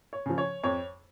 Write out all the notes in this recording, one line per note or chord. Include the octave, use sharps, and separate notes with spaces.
C#5
C#3 F3
C#5
F2 C#5